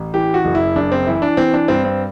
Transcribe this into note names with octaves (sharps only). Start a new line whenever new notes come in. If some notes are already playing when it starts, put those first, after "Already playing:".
Already playing: A1
E3 G4
F#4
F#1
E4
F#1 D4
C4
E3 E4
D4
E3 C4
D4
G2 C4
C4